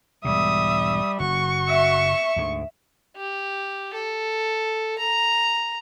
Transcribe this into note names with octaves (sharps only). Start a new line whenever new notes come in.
E1 G#2 B2 G3 E5 D#6
F#1 F#4 C#6
E5
D2 G#2
G4
A4
A#5